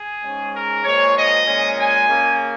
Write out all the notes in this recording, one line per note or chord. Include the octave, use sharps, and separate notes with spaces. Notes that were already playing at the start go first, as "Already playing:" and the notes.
Already playing: G#4
G#2 G#3 C#4
A#4
A#2 F3 G#3 C#5
D#5
A#2 G#3 C#4
G#5
C#3 A#3 C#4